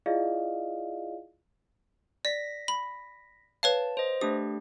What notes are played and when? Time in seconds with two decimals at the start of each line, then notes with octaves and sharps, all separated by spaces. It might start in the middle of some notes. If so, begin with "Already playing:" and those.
0.06 E4 F4 G#4 D5 D#5 F5
2.25 D5 A#6 B6
2.68 B5
3.63 B4 C#5 F5 A5
3.97 C5 D#5
4.21 A3 D4 G4 D#6